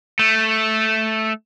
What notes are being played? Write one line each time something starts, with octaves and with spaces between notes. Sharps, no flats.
A3